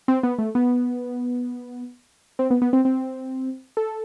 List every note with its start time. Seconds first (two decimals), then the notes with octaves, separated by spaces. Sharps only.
0.08 C4
0.23 B3
0.38 A3
0.55 B3
2.39 C4
2.50 B3
2.62 B3
2.73 C4
2.85 C4
3.77 A4